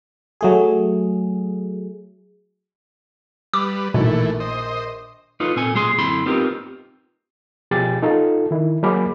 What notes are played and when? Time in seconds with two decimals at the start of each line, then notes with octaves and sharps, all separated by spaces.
0.41 F#3 A3 G#4
3.54 G3 B4 D6
3.94 A#1 B2 D#3 E3 A3
4.40 C5 D#5
5.40 D#4 F4 A4 B4
5.56 A#2 C4 A4 G#5
5.74 B1 A#2 G#3 G#4 B5 C6
5.98 F#2 D3 C4 E4 B5 C6
6.26 B3 C4 D#4 F4 G4 A#4
7.71 B2 F3 G4 G#4 G5 A6
8.02 D#4 F4 A4
8.51 D#3 E4
8.83 F#3 G#3 A#3 G#4 B5 D6